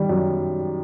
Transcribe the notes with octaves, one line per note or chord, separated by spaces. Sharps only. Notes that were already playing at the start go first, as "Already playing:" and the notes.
Already playing: D#3 G3
F#2